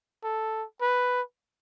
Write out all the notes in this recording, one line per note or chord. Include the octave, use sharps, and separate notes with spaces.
A4
B4